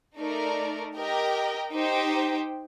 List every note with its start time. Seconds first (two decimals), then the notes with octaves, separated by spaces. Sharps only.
0.19 A3 D#4 A#4 D5
0.96 G4 A#4 D#5 G5
1.73 D#4 G4 C5 G5